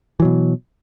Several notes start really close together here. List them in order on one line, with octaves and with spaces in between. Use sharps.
E3 F#3 B2